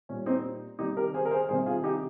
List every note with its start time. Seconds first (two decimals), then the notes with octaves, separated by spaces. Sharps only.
0.09 A#2 G3 C#4
0.26 C4 D#4
0.79 C3 D#3 G3 D#4 G4
0.97 G4 A#4
1.14 G#4 C5
1.25 A#4
1.31 G#4 C5
1.49 C3 D#3 G3 G#4 C5
1.66 F4 G#4
1.84 D#4 G4